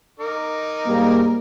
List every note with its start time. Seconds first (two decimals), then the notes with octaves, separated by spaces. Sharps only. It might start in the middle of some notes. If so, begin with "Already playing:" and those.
0.20 D#4 A#4 D6
0.87 G#2 G3 A#3